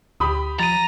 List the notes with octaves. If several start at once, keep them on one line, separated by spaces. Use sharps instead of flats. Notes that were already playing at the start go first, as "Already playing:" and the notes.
D2 G4 B5 D#6
F3 A#5 A6 D#7